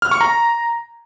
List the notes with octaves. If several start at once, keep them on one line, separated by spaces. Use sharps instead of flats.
F6
C#6
A#5